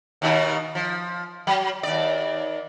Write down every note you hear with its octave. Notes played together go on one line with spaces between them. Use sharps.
D#2 B2 D#4
F3
F#3
D#2 D5